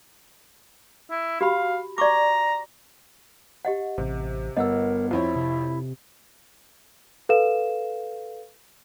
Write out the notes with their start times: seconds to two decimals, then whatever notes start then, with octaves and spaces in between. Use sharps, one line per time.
1.11 E4
1.41 F#4 G4 F5 B5
1.98 D5 A#5 C#6 D6
3.65 G4 D#5 F#5
3.98 A1 C3
4.57 G1 B3 A#4 D#5 F#5 E6
5.11 F2 C4 E4 C#5
5.36 C3
7.29 A4 B4 F5 E7